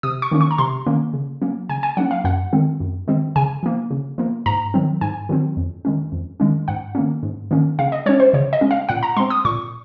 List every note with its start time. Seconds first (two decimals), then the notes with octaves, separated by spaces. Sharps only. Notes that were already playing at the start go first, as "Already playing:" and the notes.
0.03 C3 D#6
0.22 C#6
0.31 D#3 A#3 C#4
0.41 C#6
0.51 A#5
0.58 C3 C6
0.86 D#3 A#3 C#4
1.13 C#3
1.42 F#3 A#3 C#4
1.69 C#3 G#5
1.83 G#5
1.97 F#3 A#3 C#4 F#5
2.11 F5
2.24 F#2 F#5
2.53 D#3 G#3 C4
2.80 F#2
3.08 D#3 G#3 C4
3.36 C#3 G#5
3.63 F3 A#3
3.91 C#3
4.18 F3 A#3
4.46 G#2 A#5
4.74 D#3 F#3 C4
5.01 G#2 G#5
5.29 D#3 F#3 C4
5.57 F2
5.85 D#3 G#3 C#4
6.12 F2
6.40 D#3 G#3 C#4
6.68 G#2 F#5
6.95 D#3 A#3 C#4
7.23 G#2
7.51 D#3 A#3 C#4
7.79 C#3 F5
7.92 D#5
8.06 G#3 C#4 C#5
8.20 C5
8.33 C#3 C#5
8.53 D#5
8.61 G#3 C#4
8.71 F5
8.89 A#2 F#5
9.03 A#5
9.17 G#3 C4 C6
9.30 D#6
9.45 A#2 C#6